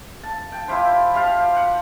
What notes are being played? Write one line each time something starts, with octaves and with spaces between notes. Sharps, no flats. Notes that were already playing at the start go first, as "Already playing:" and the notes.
A5
G5
E4 F4 G4 C5
G4 C5 F5 A5
F#5